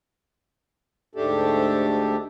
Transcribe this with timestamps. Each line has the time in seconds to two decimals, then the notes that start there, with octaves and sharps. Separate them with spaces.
1.15 D2 G#2 A3 D4 G4 A4